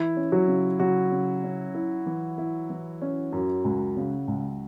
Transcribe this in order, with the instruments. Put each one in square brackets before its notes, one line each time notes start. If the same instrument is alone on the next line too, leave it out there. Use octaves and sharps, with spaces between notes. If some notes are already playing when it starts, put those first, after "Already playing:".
Already playing: [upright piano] E3 [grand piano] E4
[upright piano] C#4
[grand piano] F#3 F#4
[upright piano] C#3
[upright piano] C#3 [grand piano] F#3 F#4
[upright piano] C#3
C#4
E4
E3
E4
E3
C#4
F#2
C#2
C#3
C#2